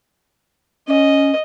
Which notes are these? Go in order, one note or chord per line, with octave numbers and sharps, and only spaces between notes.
C#4 D#5